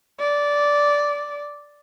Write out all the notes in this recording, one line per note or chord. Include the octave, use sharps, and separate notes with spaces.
D5